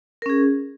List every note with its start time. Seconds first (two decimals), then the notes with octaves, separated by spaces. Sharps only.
0.22 A#4
0.26 C#4
0.29 G#4